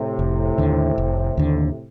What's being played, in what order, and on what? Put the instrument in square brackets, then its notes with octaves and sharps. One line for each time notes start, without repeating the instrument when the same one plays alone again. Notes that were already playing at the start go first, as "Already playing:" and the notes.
Already playing: [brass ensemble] A2 C3
[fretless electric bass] F1
D#2 D3
F1
D#2 D3